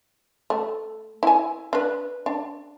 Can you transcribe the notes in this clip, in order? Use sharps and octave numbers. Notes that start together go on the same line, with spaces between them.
A3
E4 G#5
D4 B4
D4